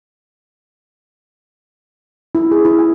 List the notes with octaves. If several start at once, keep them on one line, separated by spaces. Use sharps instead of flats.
E4
G#4
E4
G#5